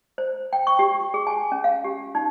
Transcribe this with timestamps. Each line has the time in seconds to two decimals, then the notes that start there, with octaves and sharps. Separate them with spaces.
0.18 C5
0.53 G5
0.67 C#6
0.79 G4
1.14 G#4
1.27 G#5
1.52 C#4
1.64 F5
1.84 G4
2.15 D#4